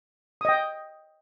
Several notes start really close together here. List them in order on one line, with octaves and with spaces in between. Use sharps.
D#6 D#5 G5